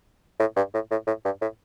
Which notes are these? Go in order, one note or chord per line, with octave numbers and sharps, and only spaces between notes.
A2
G2
A2
A2
A2
G2
A2